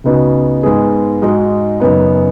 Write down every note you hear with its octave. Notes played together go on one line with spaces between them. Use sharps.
C#2 C#3 B3 D#4 F#4
G#2 G#3 B3 G#4
G#2 G#3 D#4 F#4
F#2 C#3 B3 D#4